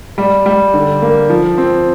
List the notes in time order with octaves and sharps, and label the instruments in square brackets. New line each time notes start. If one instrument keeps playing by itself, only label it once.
[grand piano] G3
G3
D3
A#3
F3
C4